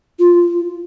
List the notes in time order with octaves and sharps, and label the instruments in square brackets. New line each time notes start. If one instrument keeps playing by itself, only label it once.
[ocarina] F4